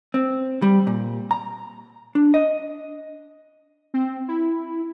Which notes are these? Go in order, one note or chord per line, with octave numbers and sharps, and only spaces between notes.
C4
G3
A#2
A#5
D4
D#5
C4
E4